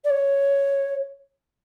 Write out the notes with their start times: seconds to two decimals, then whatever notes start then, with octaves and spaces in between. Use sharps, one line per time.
0.04 D5
0.09 C#5